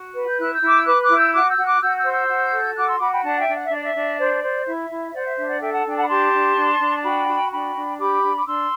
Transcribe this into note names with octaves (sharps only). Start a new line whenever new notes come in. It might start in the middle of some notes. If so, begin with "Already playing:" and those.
Already playing: F#4
B4
G6
E4 F#6
E6 G6
E4 D6
E6
B4 D6 F#6
D6 F#6
E4
E6 G6
F#4 D6 F#6
E6 G6
F#4
D6 F#6
F#4 E6 G6
E6 G6
C5
E6 G6
F#4
A4
F#4 D6 F#6
C6 E6
F#4 B5 D6
G5 B5
D4 F#5 A5
E5 G5
D4
F#5
E5
D4 D5
E5
D4
C5 D5
C5
E4 E5
E4
E5
C5 D5 F#5
E5
D4 E5
D5 F#5
A4 E5 G5
F#5 A5
D4 G5
F#5 A5
B5
G4 A5 C6
D4
D4
D4
A5
F#4 G5 B5
F#4
D4 G5 B5
D4
G4 B5 D6
D4
D6
D4 C6 E6